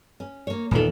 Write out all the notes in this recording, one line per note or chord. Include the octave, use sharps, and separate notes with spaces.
C#4
A#3 C#5
D#1 E2 D#3 F4 A4